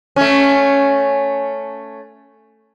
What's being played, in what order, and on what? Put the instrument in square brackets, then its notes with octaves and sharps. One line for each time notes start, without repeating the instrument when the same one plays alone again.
[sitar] A3 C#4